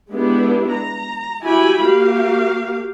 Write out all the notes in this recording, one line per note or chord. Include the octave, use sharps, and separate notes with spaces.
G#3 B3 D4 E4 G4
A#5
E4 F#4 G4 G#5 B5
A#3 F#4 G4 F5